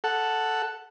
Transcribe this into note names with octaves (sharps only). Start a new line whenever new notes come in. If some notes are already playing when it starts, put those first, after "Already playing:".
A4 F#5